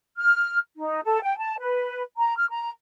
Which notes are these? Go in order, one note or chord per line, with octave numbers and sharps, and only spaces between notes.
F6
D#4
A4
G5
A5
B4
A#5
F6
A#5